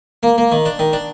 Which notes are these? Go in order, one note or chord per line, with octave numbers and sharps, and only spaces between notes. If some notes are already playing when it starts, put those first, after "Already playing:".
A#3
A#3
D#3
D4
D#3
D4